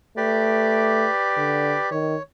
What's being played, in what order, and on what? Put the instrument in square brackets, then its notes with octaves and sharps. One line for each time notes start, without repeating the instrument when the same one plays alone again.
[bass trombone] A3 [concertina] G4 B4 D5
[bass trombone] D3
[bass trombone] D#3 [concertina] C#5